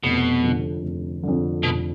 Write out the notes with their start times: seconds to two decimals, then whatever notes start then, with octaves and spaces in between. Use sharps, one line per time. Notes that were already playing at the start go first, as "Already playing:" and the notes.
0.03 F1 B2
0.43 F2 D3
0.83 F1
1.23 F2 D3
1.63 F1 B2